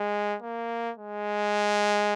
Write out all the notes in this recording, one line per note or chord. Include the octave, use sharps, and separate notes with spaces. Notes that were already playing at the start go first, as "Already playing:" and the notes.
Already playing: G#3
A#3
G#3